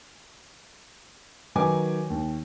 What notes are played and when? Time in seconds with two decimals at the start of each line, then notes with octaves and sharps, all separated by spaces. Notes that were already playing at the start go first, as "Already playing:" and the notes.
1.55 D#3 F#3 D#4 B4 G#5 D6
2.10 D#2